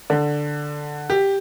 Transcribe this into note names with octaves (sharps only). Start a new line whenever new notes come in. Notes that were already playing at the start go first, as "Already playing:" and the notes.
D3
G4